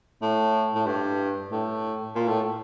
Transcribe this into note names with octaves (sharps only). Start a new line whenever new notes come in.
A2
A2
G2
A2
A#2
A2